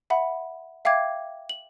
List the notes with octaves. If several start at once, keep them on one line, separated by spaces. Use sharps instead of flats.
E5 F#5 B5
E5 F5 G5 D6 G#6
F#7